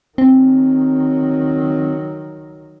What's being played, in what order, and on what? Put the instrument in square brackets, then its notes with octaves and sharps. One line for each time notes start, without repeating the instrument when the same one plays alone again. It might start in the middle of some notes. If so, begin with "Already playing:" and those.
[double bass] D#3 F#3 [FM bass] C4